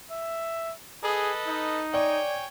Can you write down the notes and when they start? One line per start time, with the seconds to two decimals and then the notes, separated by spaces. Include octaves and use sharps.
0.11 E5
1.04 G#4 A4 B4 D#5
1.47 D#4
1.94 C#5 D5 G5 G#5